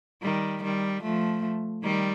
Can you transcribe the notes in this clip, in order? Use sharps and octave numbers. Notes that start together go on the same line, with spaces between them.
D#3 G3
D#3 G3
F3 A3
D#3 G3